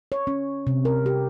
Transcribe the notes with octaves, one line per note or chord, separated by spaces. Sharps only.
C#5
C#4
C3
A#4
G4